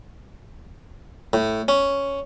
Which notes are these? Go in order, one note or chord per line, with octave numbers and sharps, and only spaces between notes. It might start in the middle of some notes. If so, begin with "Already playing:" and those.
A2
C#4